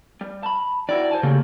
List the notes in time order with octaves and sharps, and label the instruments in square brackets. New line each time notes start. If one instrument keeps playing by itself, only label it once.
[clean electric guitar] G3
A5 B5
[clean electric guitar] D#3 E4 F#4 [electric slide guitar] D5
[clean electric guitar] C5 G#5 A5
[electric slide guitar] C#3 [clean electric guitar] A3 A#3 G4